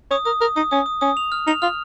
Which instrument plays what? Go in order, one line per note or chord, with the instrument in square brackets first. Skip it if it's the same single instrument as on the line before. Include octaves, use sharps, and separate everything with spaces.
[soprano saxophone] C#5 [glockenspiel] D#6
[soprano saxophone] A#4 [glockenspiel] D#6
[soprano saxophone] A#4 [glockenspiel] D#6
[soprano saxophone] D#4 [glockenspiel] D#6
[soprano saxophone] C#4 [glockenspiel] D#6
[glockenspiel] D#6
[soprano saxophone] C#4 [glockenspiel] D#6
[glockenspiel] F7
F6
[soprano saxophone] D#4 [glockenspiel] F7
[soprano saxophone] F4 [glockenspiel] F6